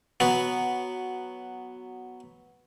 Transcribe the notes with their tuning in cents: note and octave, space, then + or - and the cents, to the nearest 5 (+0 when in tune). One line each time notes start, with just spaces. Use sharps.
F#3 +0 B3 +0